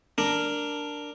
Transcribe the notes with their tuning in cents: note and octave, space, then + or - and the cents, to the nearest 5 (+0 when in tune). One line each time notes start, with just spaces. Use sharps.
D4 +0 A#4 -5